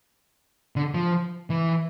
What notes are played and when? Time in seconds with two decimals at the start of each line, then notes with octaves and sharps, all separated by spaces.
0.76 D3
0.94 F3
1.50 E3